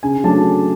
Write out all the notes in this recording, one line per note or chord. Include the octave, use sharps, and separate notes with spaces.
C#3 G#5
F#3 A3 D4 A5